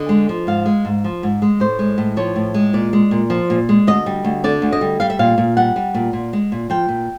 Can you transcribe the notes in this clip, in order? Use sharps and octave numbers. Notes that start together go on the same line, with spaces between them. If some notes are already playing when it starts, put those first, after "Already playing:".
Already playing: D3 D#5
G#3
F3
G#2 F5
G#3
G#2
F3
G#2
G#3
A2 C5
G#3
A2
F3 C#5
A2
G#3
A#2 D5
G#3
A#2
F3
A#2
G#3
D2 D#5
G3
D2
D3 D5
D2
D#5
G3
G3 F5
E5
A#2 F5
A#2
G3 F#5
G3
A#2
A#2
G#3
A#2
F3 G5
A#2